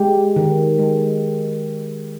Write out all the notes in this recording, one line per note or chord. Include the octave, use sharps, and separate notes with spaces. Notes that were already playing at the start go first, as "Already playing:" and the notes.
Already playing: G#3 G4
D#3
G#3